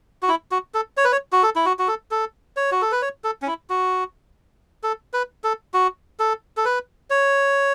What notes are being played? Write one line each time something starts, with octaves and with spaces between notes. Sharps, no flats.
F#4
E4
F#4
A4
C#5
B4
C#5
F#4
A4
E4
F#4
F#4
A4
A4
C#5
F#4
A4
B4
C#5
A4
C#4
E4
F#4
A4
B4
A4
F#4
A4
A4
B4
C#5